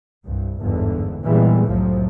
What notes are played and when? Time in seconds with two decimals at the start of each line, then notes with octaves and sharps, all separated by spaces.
0.24 C2 G2
0.60 G1 E2 G#2 D3 E3
1.24 A#2 E3 G3 G#3 B3
1.67 C2 F2 A2 F3 F#3